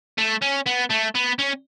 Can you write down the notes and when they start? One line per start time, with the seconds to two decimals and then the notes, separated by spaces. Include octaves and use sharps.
0.18 A3
0.42 C#4
0.66 B3
0.90 A3
1.15 B3
1.39 C#4